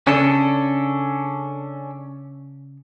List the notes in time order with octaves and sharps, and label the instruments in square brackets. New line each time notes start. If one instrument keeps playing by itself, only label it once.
[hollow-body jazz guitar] C#3 [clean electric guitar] C#4 D4 A4